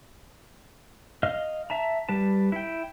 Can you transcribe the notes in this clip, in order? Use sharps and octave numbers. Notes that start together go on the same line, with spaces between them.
D#5 F5 F6
E5 A5 A#5
G3 B4 A5
E4 G5